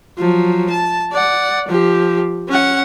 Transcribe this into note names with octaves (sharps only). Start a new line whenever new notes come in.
F3 F#3
A5
D5 F#5
F3 G4
C#4 F#5